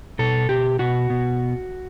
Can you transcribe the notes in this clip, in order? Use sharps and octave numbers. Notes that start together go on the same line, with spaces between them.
B2 A4
B2 G4
B2 F#4
B2